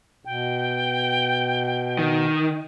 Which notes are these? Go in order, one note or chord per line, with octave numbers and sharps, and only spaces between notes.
B2 G5
D#3